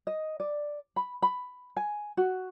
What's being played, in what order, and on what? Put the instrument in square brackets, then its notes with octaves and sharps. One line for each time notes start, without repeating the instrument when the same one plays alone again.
[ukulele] D#5
D5
B5
B5
G#5
F#4